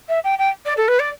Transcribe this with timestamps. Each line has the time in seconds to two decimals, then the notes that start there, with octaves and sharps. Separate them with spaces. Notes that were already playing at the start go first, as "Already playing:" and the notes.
0.09 E5
0.24 G5
0.39 G5
0.65 D5
0.77 A4
0.88 B4
0.99 D5